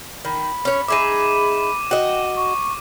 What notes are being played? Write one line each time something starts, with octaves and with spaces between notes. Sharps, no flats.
D#3 B5
C#4 C#5
D#4 G#4 E5 D6 D#7
F#4 D#5 G5
C#6